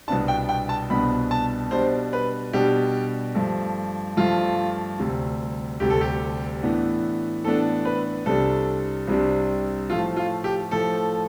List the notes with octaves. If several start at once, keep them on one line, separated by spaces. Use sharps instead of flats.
C2 B2 B3 D4 A5
G5
G5
A5
C2 B2 B3 D4 B5
A5
B2 G3 D4 C5
B4
B2 G3 D4 G4
G2 F3 A3
G2 F3 A3 F4
D2 C3 G3
D2 C3 G3 G4
A4
G4
A2 E3 B3 D4
A2 E3 B3 D4 A4
B4
C2 C3 G3 D4 A4
C2 C3 G3 D4
A2 F3 A3 F4
F4
G4
A2 F3 A3 A4